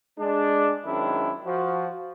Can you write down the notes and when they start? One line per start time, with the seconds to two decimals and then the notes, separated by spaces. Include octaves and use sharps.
0.19 G#3 D4
0.86 F#2 D#3 G#3 C4 D4 E4
1.45 F3 F#4